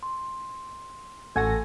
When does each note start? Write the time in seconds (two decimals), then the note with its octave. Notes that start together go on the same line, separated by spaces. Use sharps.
0.03 C6
1.36 A1 F#4 A4 G#5 A#6